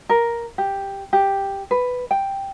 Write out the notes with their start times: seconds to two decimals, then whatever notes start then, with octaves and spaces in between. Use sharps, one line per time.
0.09 A#4
0.58 G4
1.13 G4
1.71 B4
2.11 G5